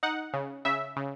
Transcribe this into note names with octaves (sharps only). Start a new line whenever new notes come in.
D#4 F#5
C#3
C#3 E5
C#3